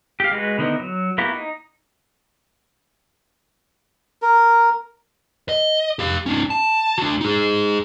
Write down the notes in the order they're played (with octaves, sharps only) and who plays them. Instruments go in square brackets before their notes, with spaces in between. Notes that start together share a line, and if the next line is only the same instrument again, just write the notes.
[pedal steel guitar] G4 F5
G#3 F#4 B4
D3 D#3 B3 D#4 E4
F#3
A#3 B3 E4 F#4 G4
D#4
[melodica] A#4
[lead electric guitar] D#5
G4 F5
C#4 D#4
A5
D4 F#4
D#4 G#4